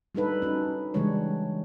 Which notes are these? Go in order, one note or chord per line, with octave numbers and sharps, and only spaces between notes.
G3 D4 D#4 A4 B4
C#4 D#4 F#4
C#3 E3 G3 G#3 D4 C#5